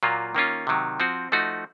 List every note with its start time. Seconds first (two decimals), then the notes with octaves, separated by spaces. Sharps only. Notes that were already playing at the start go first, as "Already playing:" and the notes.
0.03 A#2 F#3 A#3 F4
0.35 D#3 A#3 C#4 F4
0.67 C3 D#3 F#3
1.00 F3 C4 F#4
1.32 F3 A3 D#4 F#4